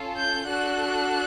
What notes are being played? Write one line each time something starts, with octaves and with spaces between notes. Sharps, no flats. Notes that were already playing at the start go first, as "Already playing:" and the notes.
Already playing: C#4 F4 A4
G6
D4 F#4 A4 F#6